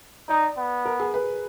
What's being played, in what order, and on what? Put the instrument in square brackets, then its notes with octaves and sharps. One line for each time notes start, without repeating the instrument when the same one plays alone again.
[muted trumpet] D#4 [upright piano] D5
[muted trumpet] B3
[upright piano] A#4
G#4
B4